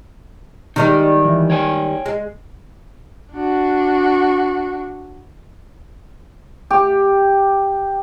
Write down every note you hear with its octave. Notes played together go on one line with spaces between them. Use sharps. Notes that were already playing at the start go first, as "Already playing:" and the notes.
D#3 G3 G#3 D#4
E3
C#5 G5 G#5
G#3
D4 F#4
G4